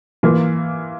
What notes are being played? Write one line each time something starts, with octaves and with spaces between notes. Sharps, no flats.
E3 A#3 F4